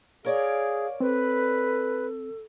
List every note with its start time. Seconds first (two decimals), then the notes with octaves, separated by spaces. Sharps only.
0.25 G#4 A#4 C#5 D5 F5
1.00 C4 A4 B4